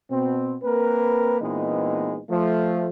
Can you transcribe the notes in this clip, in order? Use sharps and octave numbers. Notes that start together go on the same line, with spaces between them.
B2 C4
A#3 C4 A#4 B4
A#2 E3 G#3 B3 C4 D#4
F3 A3